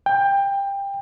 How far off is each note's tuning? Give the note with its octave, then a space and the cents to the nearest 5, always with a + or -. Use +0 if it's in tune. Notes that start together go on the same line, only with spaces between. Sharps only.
G5 +20